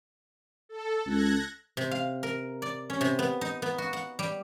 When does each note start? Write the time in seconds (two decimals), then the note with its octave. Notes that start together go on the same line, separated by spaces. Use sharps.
0.69 A4
1.06 C#2 F#6 G#6 A#6
1.77 C3
1.91 F5
2.23 A#4
2.62 D5
2.90 C#4
3.01 C3
3.19 B3
3.41 D#4
3.62 B3
3.78 F#4
3.93 F#5
4.19 G3